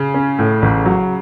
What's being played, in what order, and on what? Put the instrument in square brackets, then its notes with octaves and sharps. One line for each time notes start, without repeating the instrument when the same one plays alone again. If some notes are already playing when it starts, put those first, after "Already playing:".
Already playing: [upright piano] C#3
[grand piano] C#4
A2
A1
F#3